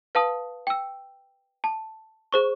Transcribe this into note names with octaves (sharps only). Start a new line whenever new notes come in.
B4 F5 A5 D#6
G5 E6
A5
G#4 C5 C#6